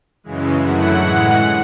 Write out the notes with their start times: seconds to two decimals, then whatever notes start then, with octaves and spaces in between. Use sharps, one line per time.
0.24 F#2 C#3 E3 G#3
0.61 F#2 D3 F#3 A3 E4 F#5
0.99 A2 E3 G#3